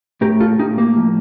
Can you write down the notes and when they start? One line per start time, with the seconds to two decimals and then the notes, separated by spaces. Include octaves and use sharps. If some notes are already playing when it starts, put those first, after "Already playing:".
0.21 A2 G4 A#4
0.40 F4 A4
0.59 A2 D#4 G4
0.78 A#3
0.97 F3